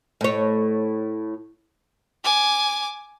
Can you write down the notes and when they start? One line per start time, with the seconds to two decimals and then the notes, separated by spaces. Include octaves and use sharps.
0.21 A2 C#5
2.24 G#5 D6